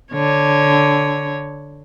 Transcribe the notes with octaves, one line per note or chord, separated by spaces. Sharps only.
D3 C#5